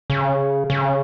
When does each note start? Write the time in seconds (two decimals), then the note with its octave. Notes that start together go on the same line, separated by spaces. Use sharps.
0.10 C#3
0.70 C#3